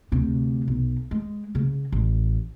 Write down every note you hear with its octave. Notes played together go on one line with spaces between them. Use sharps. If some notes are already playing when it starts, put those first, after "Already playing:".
D2 C3
B1
G#3
C#3
A1